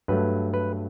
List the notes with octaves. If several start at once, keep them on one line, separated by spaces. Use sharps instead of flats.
G2 F#3 A3 B4
B4